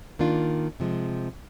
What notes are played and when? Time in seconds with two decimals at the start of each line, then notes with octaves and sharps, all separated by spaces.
0.19 D#3 A#3 D4 F4
0.80 C3 F3 G#3